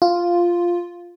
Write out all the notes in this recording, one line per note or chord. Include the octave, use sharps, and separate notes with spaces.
F4